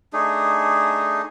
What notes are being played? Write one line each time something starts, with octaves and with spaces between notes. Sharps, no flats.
A3 D4 D#4 G#4